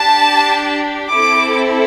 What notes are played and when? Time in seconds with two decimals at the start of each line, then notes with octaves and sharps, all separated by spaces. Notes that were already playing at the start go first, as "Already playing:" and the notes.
Already playing: D4 G4 A5
1.12 C4 E4 A4 D6